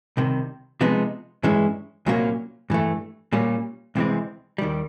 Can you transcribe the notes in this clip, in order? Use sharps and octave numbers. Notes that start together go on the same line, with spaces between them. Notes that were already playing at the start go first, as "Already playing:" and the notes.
C2 C3 D#3
C3 F3 G#3 B3 D#4
G2 E3 G#3 C#4 E4
C2 A#2 F#3 A#3 C#4
G2 E3 A3
A#2 G3 A#3 C#4
C2 C3 E3 G#3 C4
D#2 D#3 G3